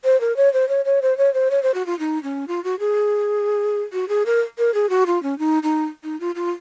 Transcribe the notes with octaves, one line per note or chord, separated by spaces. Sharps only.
C5
A#4
C#5
C5
C#5
C#5
C5
C#5
C5
C#5
C5
F#4
F4
D#4
C#4
F4
F#4
G#4
F#4
G#4
A#4
A#4
G#4
F#4
F4
C#4
D#4
D#4
D#4
F4
F4